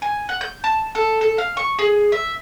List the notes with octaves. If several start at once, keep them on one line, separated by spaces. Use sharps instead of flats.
G#5
F#5
G6
A5
A4
A4
F5
C#6
G#4
E5